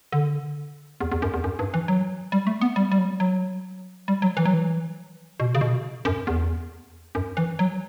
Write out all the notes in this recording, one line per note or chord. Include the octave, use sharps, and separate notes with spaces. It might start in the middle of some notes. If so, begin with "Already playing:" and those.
D3
E2
E2
F#2
E2
F#2
G2
E3
F#3
G3
A3
B3
G3
G3
F#3
F#3
G3
F#3
E3
F#3
E3
B2
C#3
B2
F#2
E2
F#2
E3
F#3